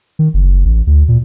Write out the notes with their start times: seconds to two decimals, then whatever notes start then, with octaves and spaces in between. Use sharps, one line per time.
0.19 D#3
0.34 F#1
0.65 A1
0.87 D2
1.08 A#2